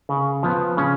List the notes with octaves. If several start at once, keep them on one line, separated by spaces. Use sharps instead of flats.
C#3
F3 B3
C#3 C#4